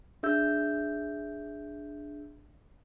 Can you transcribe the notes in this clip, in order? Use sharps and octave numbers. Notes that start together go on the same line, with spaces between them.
D4 G#4 E5 E6 G6